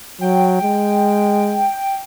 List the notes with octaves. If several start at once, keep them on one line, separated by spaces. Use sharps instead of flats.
F#3 G5
G#3